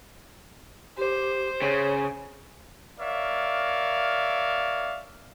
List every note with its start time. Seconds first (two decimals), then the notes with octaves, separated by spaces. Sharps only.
0.98 G4 C5
1.62 C#3 C#5
3.00 A#4 C#5 D5 E5 F5